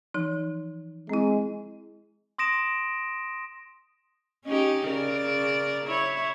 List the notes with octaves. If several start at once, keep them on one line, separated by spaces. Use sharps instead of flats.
E3 F3 D#4
G#3 C4 E4
C6 D#6 A#6 D7 E7
C#4 D#4 G4
C#3 A#4 D5
E4 C#5